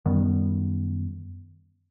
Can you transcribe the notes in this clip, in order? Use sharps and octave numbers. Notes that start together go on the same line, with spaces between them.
F#2 D#3 G3 B3